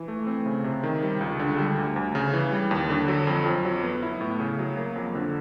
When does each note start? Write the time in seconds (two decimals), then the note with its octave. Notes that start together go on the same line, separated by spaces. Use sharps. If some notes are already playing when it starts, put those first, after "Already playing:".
Already playing: E3
0.08 A3
0.27 C4
0.46 C#3
0.64 C3
0.83 D#3
1.03 G3
1.21 C#2
1.39 D3
1.58 G3
1.77 D2
1.96 D2
2.15 C#3
2.33 E3
2.52 G3
2.71 D#2
2.90 D3
3.08 F#3
3.27 F2
3.46 F2
3.65 F#3
3.83 B3
4.03 E4
4.21 A2
4.40 C#3
4.59 F#3
4.77 A#3
4.96 F2
5.15 D3